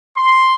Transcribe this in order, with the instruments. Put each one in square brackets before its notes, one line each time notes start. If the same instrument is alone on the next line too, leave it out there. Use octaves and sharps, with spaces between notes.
[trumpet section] C6